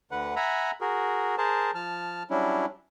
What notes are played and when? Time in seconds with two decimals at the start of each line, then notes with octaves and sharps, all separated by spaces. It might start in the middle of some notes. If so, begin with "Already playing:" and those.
0.11 D2 D3 B4 F#5
0.36 E5 F#5 G#5 A#5 B5
0.81 F#4 G#4 A#4
1.38 G#4 A#4 C5 A5
1.75 F3 A5 F6
2.30 F#3 G3 C#4 D4 E4